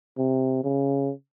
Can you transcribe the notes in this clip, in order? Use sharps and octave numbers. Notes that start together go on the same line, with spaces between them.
C3
C#3